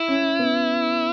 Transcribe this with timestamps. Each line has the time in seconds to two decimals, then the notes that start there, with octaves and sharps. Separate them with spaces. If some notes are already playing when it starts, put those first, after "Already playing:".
Already playing: E4
0.08 C#4
0.39 B3